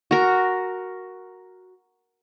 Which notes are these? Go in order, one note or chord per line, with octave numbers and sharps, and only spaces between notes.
F#4 A#4